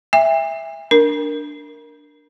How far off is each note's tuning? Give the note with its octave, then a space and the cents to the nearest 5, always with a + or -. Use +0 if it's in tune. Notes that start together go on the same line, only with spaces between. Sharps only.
E5 +0 G5 +45
D4 +0 A#4 +0